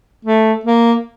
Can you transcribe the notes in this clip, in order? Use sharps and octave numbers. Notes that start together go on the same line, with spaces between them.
A3
A#3